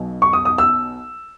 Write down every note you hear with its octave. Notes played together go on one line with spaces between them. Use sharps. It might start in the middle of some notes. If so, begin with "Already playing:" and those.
Already playing: B1 B2 F#3
C#6
D#6
D#6
E6